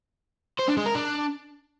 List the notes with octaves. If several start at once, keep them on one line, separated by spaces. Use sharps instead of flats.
C5
D4
G#3
A#4
D4